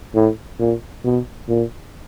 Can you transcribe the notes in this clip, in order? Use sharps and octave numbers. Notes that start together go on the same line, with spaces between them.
A2
A#2
B2
A#2